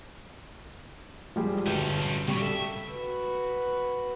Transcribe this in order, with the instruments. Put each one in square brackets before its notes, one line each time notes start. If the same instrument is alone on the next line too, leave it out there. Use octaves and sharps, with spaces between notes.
[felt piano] F3 G3 G#3
[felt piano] G1 F#4 G6 [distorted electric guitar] C#4 A4
[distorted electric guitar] C#3 [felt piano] G3 C#6
[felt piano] A4 [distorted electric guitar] E5
[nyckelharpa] F#4 B4